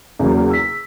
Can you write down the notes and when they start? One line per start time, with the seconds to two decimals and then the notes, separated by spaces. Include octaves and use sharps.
0.19 E2 C#3 F#3 A#3
0.50 E6 B6